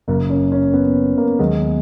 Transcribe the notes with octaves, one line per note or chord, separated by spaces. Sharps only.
F#1 F#2 C#3 A#3
C#4
C#4
B3
A#3
D#2 D#3 F#3 G#3 B3